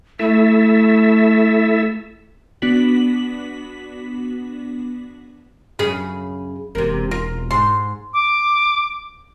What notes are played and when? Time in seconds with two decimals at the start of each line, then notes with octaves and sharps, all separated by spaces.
0.19 A3 E4 A4 E5
2.62 B3 D4 F#4 B6 F#7
5.79 F#2 C#3 G#4 B5
6.75 E1 C3 A#3
7.11 F4 A#4
7.51 G#2 C6
8.14 D6